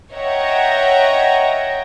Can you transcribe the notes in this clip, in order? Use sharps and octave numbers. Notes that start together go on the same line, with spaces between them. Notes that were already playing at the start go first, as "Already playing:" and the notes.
C#5 D#5 E5 F#5 G5 A#5